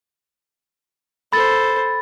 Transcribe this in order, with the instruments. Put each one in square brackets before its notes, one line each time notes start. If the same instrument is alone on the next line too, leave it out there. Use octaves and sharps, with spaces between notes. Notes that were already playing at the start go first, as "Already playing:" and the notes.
[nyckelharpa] A4 C5 [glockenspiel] B5 A6